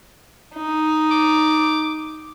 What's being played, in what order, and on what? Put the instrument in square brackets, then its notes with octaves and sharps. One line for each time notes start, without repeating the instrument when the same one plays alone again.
[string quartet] D#4
[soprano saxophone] D6